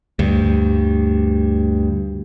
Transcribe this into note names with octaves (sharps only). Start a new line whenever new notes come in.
D2 G2